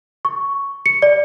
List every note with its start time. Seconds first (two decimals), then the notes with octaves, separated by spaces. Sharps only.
0.25 C#6
0.86 C#7
1.02 D5